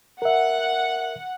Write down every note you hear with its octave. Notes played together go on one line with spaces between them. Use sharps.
A#4 E5 F#5